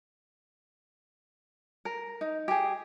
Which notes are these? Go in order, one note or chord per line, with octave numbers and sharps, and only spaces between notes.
A#4
D#4
G4 G#4